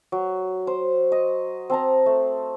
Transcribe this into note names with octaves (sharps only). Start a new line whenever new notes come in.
F#3
C5
D#5
C4 A5 A#5
A3